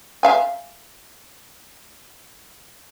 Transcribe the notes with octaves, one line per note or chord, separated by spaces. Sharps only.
E5 F5 G#5